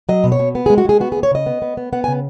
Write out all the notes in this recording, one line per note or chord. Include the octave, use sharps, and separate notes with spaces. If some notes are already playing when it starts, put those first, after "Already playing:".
F#3 D#5
B2
C#5
B2
B3
G#4
G#3
F#4
G#3 G#4
B3 F#4
G#4
D#2
C#5
C#3 D#5
B3
B3
B3
B3 F#5
G#5
C#3